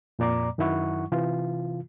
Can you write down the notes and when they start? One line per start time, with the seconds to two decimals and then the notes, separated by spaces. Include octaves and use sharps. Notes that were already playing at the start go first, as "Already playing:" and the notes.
0.19 F2 A#2 D5 A#5 D6
0.58 F#2 D#3 F#3 E4 F#5 C#6
1.12 C3 E3 F4